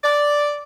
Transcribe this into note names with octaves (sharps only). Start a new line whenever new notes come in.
D5